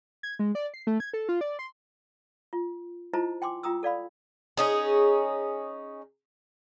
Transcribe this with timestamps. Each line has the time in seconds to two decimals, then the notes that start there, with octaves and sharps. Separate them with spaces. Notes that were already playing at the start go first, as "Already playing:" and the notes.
0.23 G#6
0.39 G#3
0.55 D5
0.74 C7
0.87 A3
1.00 G#6
1.13 A4
1.29 F4
1.41 D5
1.59 C6
2.53 F4
3.13 E4 F4 C5 D#5 A5 A#5
3.42 G5 G#5 C6 D6
3.63 F4 G5 A#5 D#6 E6
3.83 A4 D5 F5 B5
4.57 C#4 D#4 G#4